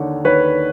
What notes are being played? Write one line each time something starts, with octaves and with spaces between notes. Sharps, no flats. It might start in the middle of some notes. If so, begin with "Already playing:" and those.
Already playing: D#2 D3 C#5
D#2 B4 C#5